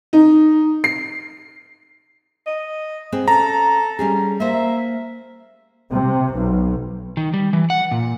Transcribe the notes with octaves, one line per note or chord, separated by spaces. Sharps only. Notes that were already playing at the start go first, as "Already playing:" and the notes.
D#4
C7
D#5
B3 C4 G#4
C#4 A4 A#5
G3 C#4 G#4
A#3 C5 E5
C3
B1
D#3
G3
E3
F#5
A#2